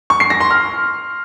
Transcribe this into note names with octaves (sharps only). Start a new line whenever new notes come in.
C#6
C7
A#6
C6
F6